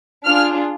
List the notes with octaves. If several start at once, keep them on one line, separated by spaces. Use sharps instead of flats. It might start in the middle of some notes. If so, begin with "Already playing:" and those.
D4 F4 G#4 F6